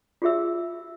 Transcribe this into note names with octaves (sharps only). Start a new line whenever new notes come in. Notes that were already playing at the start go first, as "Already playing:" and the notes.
F4 F#4 G#4 E5 E6